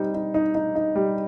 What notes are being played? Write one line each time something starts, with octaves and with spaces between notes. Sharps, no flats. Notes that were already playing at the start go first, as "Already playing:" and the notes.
Already playing: G3 C4 D#4
D#4
D#4
D#4
D#4
G3